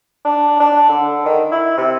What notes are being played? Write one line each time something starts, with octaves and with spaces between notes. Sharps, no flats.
D4
D4
D3
D#3
E4
C3